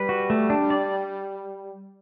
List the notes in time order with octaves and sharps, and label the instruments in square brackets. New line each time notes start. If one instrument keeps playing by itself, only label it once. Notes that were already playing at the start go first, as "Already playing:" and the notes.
Already playing: [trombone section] G3 [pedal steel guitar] B4
[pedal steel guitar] F#4
A3
D4
D5